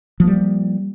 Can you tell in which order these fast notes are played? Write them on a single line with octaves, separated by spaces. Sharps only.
F3 A#3 G3